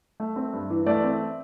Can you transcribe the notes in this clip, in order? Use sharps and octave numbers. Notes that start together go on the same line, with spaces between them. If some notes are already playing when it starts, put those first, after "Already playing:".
A3
C4
G2
E3
A3 D5
C4